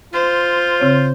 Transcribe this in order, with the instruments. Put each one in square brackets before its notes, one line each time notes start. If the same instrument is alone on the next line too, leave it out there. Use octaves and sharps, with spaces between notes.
[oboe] F4 [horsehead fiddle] C5
[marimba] C#3 C4 C#5